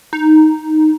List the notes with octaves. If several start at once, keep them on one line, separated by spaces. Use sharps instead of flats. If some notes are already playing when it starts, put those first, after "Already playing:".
D#4